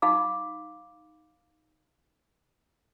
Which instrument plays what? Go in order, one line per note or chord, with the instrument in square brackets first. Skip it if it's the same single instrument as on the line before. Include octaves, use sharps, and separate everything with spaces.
[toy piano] D#4 F5 B5 D6